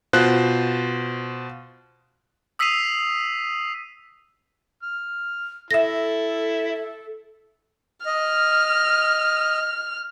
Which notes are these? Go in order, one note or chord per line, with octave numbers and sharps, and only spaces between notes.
B2 F4 C5 F#6
D#6 E6 B6 C7 D#7 F7
F6
E4 A4 E5 A#6
D#5 F6